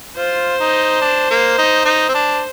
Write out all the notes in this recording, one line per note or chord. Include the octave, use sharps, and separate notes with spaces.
F4 C5
D#4
D4
A#3
D#4
D#4
C4
D4